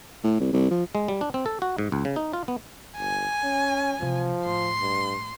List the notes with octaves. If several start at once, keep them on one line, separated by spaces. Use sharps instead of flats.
A2
C2
C2
F3
G#3
G3
D4
C4
A4
F#4
G#2
C#2
C#3
D#4
F4
B3
G1 G#5
C#4
C3 E3 F3
A2 C6
G2